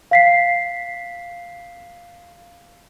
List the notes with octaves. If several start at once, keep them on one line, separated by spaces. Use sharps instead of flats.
F5 B6 C7